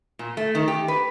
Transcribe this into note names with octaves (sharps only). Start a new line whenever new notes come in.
A#2
A3
D#3
G4
B4